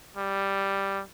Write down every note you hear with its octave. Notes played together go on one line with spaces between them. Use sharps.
G3